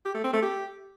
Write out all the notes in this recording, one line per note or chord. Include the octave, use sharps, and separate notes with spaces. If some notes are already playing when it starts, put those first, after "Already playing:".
G4
A3
C4
A3
G4